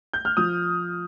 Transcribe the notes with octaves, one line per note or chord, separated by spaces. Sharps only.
G6
F6
F3 D#6